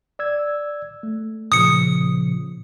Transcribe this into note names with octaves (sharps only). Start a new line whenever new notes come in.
D5 E6 G#6
A3
A#2 C#3 F3 D#6 C#7